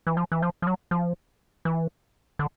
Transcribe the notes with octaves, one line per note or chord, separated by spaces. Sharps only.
E3
F3
E3
F3
F3
F#3
F3
E3
D3